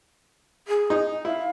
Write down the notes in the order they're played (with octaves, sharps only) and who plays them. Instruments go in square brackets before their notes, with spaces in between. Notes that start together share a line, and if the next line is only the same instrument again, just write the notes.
[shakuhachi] G#4
[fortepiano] D#4
[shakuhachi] D#5
[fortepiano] E4 [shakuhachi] F5